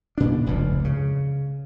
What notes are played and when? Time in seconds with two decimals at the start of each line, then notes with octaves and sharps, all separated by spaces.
0.18 A#2 D4
0.46 F1 C#2 G2 A#2
0.84 C#3